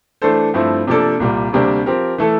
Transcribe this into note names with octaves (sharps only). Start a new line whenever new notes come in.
E3 A3 D4 A4 C5
G2 F3 A3 C4 E4
C3 F3 A#3 D4 A4
C2 A#2 G3
D2 C3 G3 A#3 D4
F3 C4 G4 A#4
E3 A3 E4 A4